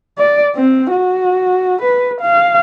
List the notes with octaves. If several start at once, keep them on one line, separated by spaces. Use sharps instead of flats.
D5
C4
F#4
B4
F5